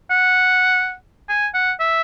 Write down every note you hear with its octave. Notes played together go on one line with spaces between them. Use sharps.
F#5
G#5
F#5
E5